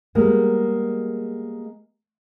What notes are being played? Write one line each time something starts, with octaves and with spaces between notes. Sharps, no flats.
G3 G#3 A#3 B3